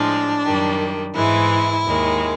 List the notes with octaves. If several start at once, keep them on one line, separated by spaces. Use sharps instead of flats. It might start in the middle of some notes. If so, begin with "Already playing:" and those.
Already playing: A2 F3 G#3 D4
F#2 D#3 G3
G#2 E3 G#3 E4
D#2 D#3 G#3